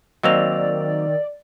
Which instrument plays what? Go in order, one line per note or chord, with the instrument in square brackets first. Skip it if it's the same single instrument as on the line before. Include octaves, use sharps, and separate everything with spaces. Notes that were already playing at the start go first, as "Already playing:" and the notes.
[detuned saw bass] D#3 [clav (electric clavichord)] F#3 A#3 C4 [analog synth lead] D5 [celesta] D#5 E6 F7